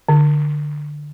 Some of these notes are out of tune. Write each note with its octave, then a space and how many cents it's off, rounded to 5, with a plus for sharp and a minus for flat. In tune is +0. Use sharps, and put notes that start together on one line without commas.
D3 +10